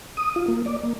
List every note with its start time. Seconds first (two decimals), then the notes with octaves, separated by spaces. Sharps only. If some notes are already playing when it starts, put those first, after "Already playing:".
0.17 D#6
0.36 F4
0.48 A#3
0.66 D5
0.83 A#3